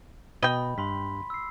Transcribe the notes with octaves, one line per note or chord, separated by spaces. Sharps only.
B2 D#5 G5 B5
G2 B5 C6 B6
E6 C7